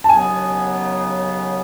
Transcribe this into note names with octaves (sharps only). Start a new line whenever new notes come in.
A5
D#2 C#3 F#3 B3 G#5